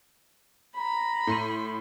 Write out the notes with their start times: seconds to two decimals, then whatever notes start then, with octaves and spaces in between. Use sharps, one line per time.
0.77 A#5 B5
1.27 A2 C6 D#7